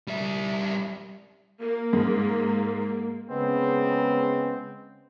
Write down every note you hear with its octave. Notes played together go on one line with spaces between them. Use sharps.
G3 E5
A#3
G#2
C#3 G#3 B3 C4